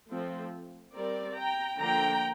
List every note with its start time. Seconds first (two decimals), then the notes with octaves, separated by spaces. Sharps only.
0.10 F3 A3 C4
0.94 G3 C4 A#4 D5
1.37 G5 A#5
1.79 D3 F3 A#3 D4 G5 A#5